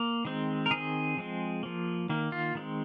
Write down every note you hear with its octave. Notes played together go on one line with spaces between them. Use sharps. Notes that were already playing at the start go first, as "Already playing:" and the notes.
Already playing: A#3
D#3 G#3 C4
A#4
D#3 C4 G#4
F3 G#3 C4
F3 A#3
D#3 A#3
F4
D#3 G#3 C4